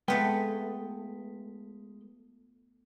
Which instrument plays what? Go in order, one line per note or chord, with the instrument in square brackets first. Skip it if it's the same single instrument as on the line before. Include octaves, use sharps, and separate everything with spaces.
[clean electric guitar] G#3 B4 G5 [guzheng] A3 B3 F4